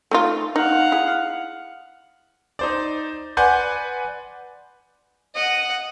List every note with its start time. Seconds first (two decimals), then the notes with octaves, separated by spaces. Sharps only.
0.11 A3 D#4 F4
0.56 D#4 F5 F#5
0.92 E4 G#4
2.59 D#4 C5 D5
3.37 B4 D5 F#5 G#5 C6 G6
5.35 D#5 F#5